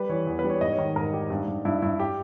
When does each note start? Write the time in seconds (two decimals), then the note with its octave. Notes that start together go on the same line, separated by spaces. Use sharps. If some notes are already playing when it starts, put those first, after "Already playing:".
Already playing: G3 B4
0.09 E3 C#5
0.27 E2
0.39 B4
0.44 G3
0.50 C#5
0.61 G#2 D#5
0.73 C#5
0.78 D#3
0.96 G#2 A#4
1.13 G#2 G4
1.30 G2
1.48 G2
1.65 G2 E4
1.82 G2 E4
2.00 G4